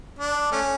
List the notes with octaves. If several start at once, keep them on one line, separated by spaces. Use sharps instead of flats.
D4
A3 C#4